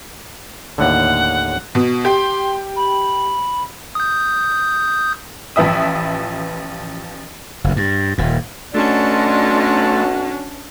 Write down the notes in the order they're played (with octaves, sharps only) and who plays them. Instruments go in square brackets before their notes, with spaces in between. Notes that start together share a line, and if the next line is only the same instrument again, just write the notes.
[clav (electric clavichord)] D#2 A2 D3 [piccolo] F#5
[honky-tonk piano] B2
[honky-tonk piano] G4 [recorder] C6
[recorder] B5
[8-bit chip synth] D#6 G6
[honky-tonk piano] A1 F3 B4 E5 D#6
[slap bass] F#1 D2
G2
D#1 A#2
[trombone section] B1 F#4 [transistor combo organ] A3 [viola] C#4 D4 [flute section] D5 D#5 C6